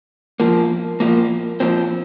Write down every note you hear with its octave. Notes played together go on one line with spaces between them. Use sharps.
A#2 F3 A#3
A#2 F3 A#3
A#2 F3 C4